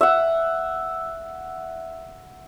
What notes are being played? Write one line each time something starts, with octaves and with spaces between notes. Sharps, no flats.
E5 F#5